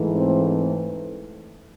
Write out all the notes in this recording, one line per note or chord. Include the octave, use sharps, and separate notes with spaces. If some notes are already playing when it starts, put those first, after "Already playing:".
Already playing: G#2 E3 A3
C4